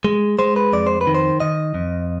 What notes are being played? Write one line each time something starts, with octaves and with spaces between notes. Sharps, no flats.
G#3
G#3 C5
B4
F2 D5
C5
B4
D#3
C5
D#3 D#5
F2